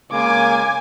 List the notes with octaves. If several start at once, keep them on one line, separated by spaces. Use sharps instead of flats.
C#3 G#3 A#3 G#5 D6